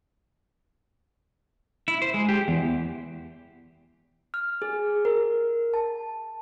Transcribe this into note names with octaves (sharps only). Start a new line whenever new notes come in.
E4
C5
G#3
G4
E2
F6
G#4
A#4
A5